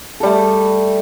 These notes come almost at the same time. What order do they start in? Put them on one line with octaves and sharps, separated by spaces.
A4 G3 A3